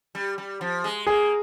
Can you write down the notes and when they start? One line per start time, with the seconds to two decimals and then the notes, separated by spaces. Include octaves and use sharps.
0.15 G3
0.38 G3
0.61 F3
0.84 G#3
1.07 A#3 G#4